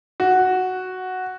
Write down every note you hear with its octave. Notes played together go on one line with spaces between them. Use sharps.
F#4